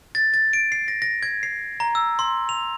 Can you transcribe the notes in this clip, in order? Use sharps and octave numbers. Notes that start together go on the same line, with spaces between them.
A6
A6
D7
C7
A#6
A#6
G#6
C7
A#5
E6
C6
F7